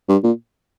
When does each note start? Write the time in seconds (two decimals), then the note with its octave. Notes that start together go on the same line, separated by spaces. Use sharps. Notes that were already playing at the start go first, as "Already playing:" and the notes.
0.09 G2
0.24 A#2